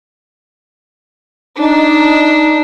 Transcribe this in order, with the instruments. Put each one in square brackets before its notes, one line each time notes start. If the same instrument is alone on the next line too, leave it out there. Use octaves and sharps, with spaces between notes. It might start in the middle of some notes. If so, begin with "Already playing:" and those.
[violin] D4 [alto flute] D#4